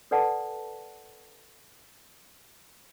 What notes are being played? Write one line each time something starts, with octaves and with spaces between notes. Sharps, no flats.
A4 B4 D5 F#5 A5